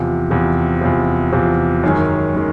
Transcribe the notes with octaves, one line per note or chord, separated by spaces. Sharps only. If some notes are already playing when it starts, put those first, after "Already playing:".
Already playing: E2 C3 F3
E2 C3 F3
E2 C3 F3
E2 C3 F3
F#2 D#3 G#3 C#4
D#3 G#3 C#4